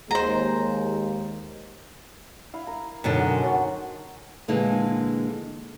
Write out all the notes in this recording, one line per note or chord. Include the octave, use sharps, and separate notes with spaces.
D#2 G#3 C5 A#5
E4 F5
A#4
F#2 B2 D3 D#3 F#3 D#4
F#4 G#4 C6
F#4 C5 C#5
A#2 D3 E3 G#3 A#3